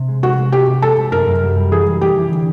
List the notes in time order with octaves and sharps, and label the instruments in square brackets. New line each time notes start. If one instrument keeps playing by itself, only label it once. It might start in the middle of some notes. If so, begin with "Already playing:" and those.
Already playing: [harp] C3
G#3
[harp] G#3 [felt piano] F#4
[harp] G#3
[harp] G#3 [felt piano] G4
[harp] C3
[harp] G#3 [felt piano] A4
[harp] G#3
[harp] F#2 [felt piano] A#4
[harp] F#2
G3
G3
[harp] E3 [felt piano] G#4
[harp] G3
[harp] G3 [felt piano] G4
[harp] E3
D3